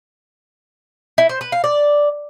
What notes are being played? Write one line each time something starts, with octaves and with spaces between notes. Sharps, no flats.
E4
C5
B4
F5
D5